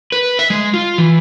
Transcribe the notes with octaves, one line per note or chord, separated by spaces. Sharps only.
B4
E5
G#3
F4
E3